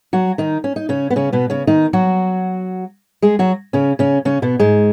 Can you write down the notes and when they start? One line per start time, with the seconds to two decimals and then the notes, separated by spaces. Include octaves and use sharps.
0.13 F#3 F#4
0.38 D#3 D#4
0.64 C#4
0.76 D#4
0.89 C#3 C#4
1.10 B3
1.16 C#3 C#4
1.33 B2 B3
1.50 C#3 C#4
1.67 D#3 D#4
1.93 F#3 F#4
3.22 G#3 G#4
3.39 F#3 F#4
3.73 C#3 C#4
3.99 C#3 C#4
4.25 C#3 C#4
4.42 B2 B3
4.59 G#2 G#3